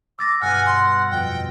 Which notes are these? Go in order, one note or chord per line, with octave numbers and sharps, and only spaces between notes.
D6 E6 A6 A#6
G2 B2 F#5 G#5 F6 A#6
C6
F2 B2 G5